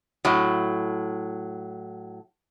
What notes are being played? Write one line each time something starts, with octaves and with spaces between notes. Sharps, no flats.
A2 F#3